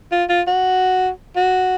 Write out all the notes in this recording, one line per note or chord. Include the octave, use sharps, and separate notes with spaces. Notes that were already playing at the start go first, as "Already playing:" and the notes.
F4
F4
F#4
F#4